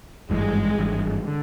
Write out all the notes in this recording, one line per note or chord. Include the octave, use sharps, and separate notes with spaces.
G#1 G2 E3 G#3
G#1 G2 E3
D3